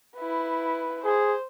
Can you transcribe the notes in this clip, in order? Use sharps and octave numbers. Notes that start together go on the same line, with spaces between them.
E4 B4
G#4 C5